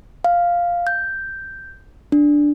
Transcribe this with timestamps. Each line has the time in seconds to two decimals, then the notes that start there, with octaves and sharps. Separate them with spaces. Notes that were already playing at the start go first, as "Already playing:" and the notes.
0.24 F5
0.87 G6
2.12 D4